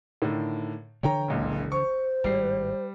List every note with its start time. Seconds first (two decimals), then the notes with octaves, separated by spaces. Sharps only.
0.22 A2 D3 D#3
1.03 C#3 E3 F3 C#5 G5 A#5
1.28 F#1 C#2 A#2
1.72 C5 C#6
2.24 G#1 A2 G3 C7